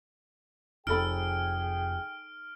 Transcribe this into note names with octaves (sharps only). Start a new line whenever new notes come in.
F1 D#4 G#4 A4 G5 B5 F6 D7